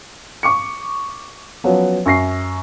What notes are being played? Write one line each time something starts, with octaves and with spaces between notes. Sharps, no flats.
C#6 D6 C#7
F3 F#3 B3 C#4
F#2 C#6 A#6 C7